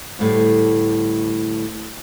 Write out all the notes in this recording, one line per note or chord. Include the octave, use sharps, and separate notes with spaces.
D2 A2 G3